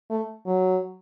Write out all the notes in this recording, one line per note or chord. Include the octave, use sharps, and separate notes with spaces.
A3
F#3